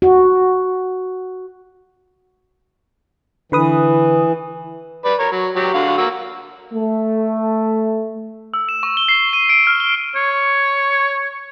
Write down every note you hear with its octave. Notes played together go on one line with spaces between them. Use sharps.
F#4
D3 E3 B4 D#6
B4 D5
A#4 C#5
F#3
F#3 G4
D3 F#4 F5
A#3 F#4 E6
A3
E6
E7
C#6
G7
C7
D#7
D7
F6
G7
C#5